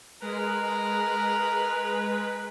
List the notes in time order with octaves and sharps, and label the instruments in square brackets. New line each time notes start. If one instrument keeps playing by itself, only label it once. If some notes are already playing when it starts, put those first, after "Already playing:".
[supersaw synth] G#3 [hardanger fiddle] A#4 [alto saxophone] B4